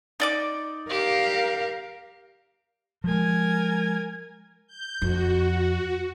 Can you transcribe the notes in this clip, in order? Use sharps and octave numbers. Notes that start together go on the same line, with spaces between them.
D#4 D5 D6
G4 A#4 F5
F3 G#3 A#4 G#5
G6
F2 F#4